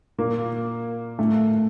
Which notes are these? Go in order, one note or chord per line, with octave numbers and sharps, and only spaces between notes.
A#2 A#3
A2 A3